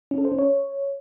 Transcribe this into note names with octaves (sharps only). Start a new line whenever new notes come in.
C#4
A4
C5
C#4
C#5